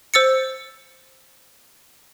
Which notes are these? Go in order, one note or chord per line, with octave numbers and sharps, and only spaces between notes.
C5 E6 A6 C#7